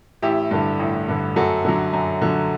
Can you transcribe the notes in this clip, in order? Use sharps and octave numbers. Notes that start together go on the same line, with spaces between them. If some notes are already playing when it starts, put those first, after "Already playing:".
A1 E4 G4
G2 D3
A1
G2 D3
F#2 F#4 A4
D3 F#3
F#2
D3 F#3